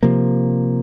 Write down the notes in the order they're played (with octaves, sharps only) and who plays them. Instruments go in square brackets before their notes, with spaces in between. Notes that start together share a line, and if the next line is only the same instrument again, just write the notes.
[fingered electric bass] C3 F3 A#3